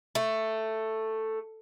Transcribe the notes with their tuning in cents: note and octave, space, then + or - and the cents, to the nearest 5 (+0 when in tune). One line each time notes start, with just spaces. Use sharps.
A3 +5